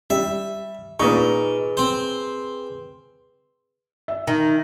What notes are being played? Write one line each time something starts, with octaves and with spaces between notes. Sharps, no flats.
G3 E5
A#2 D#4 G#4 B4 D#5 C#6
C4 C5
E5
D#3